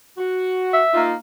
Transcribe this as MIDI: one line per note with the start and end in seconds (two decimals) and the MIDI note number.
0.18 0.81 66
0.73 1.02 76
0.93 1.13 58
0.93 1.13 63
0.93 1.13 65